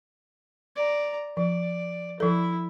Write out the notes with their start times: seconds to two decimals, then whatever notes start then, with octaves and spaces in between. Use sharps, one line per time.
0.76 D5 A#5
1.37 F3 D5
2.20 F3 E4 A4